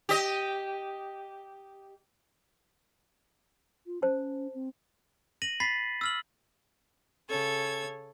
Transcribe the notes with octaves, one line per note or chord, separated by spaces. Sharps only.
G4 D#5
F4
C#4 C5 A5
C4
A#6 D#7 F#7
B5 A6 B6 C7
E6 F6 F#7
C#3 A4 C#5 G#6